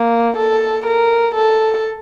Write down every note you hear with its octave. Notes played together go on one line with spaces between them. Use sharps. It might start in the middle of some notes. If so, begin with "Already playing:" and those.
Already playing: A#3
A4
A#4
A4